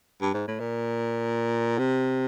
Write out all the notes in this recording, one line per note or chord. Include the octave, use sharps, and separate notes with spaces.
G2
G#2
A2
A#2
C3